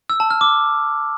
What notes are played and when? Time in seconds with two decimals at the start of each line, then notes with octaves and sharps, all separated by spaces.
0.10 E6
0.20 A5
0.31 F6
0.41 D6